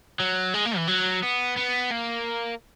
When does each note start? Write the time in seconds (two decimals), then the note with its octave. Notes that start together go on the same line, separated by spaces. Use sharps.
0.20 F#3
0.54 G#3
0.66 A#3
0.77 E3
0.88 F#3
1.23 B3
1.57 B3
1.92 A#3